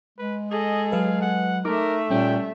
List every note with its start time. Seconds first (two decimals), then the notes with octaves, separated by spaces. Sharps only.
0.18 G#3 B4
0.51 G#4 A4 D#5
0.92 F#3 B4 F5
1.22 F#5
1.65 A3 D#4 A#4 E5 D6
2.10 A#2 G3 C#4 G5